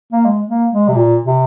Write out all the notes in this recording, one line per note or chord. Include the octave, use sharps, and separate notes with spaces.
A#3
G#3
A#3
G#3
C3
A#2
C3